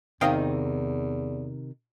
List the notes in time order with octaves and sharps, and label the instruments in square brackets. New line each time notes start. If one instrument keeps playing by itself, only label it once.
[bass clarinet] E2 [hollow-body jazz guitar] C3 D#3 D#4 [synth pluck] D#5 F5 G5